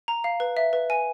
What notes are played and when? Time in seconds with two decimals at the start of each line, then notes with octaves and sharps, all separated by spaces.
0.08 A#5
0.24 F5
0.40 B4
0.57 E5
0.73 B4
0.90 G#5